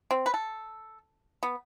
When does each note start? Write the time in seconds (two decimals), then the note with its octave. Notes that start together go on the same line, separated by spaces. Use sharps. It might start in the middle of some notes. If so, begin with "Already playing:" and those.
0.11 C4
0.26 B4
0.34 A4
1.43 B3